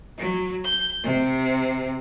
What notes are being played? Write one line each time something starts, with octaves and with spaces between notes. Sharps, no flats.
F#3
G6
C3